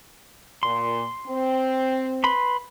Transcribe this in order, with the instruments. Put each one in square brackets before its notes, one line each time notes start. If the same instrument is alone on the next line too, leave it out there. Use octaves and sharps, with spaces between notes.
[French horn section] A#2 [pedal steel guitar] C6
[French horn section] C4
[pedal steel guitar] B4 B5 C6